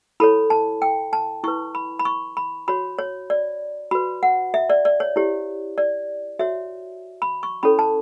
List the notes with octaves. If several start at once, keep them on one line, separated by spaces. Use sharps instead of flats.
E4 A4 C#5 B5
A5
G5
A5
E4 B4 C#6
B5
B5
C#6
B5
F#4 C#5 B5
C#5
D5
F#4 B4 B5
F#5
E5
D5
D5
C#5
E4 G4 C#5
D5
F#4 C#5 E5
B5
C#6
C#4 E4 A4 C#5 B5
A5